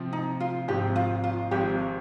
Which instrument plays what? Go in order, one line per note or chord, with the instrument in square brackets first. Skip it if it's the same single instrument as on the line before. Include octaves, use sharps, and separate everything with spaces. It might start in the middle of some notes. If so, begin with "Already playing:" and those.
Already playing: [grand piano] C3 F3 C4
[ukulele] D#4
F4
[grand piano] G#1 G#2 F3 C4 [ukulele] G4
[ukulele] F4
F4
[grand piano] G#1 G#2 F3 C4 [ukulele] G4